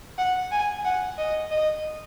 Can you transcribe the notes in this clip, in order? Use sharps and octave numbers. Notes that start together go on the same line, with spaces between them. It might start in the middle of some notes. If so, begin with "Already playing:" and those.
F#5
G#5
F#5
D#5
D#5